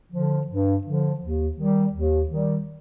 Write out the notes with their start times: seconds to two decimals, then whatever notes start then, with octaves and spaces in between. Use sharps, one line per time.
0.12 D3 F3
0.48 G2
0.84 D3 F3
1.21 D#2
1.57 D#3 G3
1.94 D#2
2.29 D#3 G3